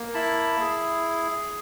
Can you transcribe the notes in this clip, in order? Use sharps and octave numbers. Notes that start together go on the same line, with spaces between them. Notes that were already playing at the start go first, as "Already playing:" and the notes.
Already playing: A#3
E4 A5 B5
G#4